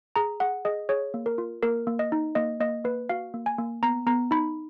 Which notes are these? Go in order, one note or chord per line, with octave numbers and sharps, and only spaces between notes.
G#4 A#5
G#4 F#5
G#4 D#5
G#4 C#5
A#3
A#4
F4
A#3 A#4
A#3
D#5
D#4
A#3 D#5
A#3 D#5
A#3 B4
F#4 F5
A#3
G#5
A#3
B3 A#5
B3 A#5
D#4 B5